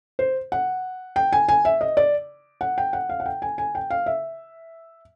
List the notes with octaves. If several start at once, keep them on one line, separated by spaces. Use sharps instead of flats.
C5
F#5
G5
G#5
G#5
E5
D#5
D5
F#5
G5
F#5
F5
F#5
G5
G#5
G#5
G5
F5
E5